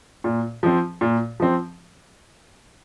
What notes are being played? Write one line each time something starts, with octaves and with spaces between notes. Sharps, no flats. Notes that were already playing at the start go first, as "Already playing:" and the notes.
A#2
F3 C4
A#2
F3 C4